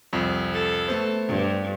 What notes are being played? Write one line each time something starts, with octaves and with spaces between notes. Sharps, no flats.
C2 F2
A4
A3 B3 C5
G2